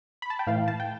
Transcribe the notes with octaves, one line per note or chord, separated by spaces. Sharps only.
B5
A5
G5
A2 E3 F5
A5
G5